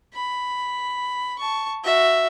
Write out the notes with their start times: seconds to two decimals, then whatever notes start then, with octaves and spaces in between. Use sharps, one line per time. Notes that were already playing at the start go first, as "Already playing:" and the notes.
0.14 B5
1.39 A5 C#6
1.84 F#4 E5